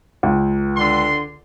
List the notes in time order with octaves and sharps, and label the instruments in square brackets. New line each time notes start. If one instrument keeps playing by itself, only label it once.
[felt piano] C#2
[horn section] D3 C6